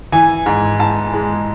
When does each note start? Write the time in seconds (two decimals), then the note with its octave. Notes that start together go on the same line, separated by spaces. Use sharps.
0.12 E3 G#5
0.46 G#2
0.80 G#2 A5
1.14 G#3